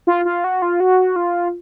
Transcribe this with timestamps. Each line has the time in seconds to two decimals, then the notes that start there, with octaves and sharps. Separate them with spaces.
0.07 F4
0.25 F4
0.44 F#4
0.62 F4
0.80 F#4
1.16 F4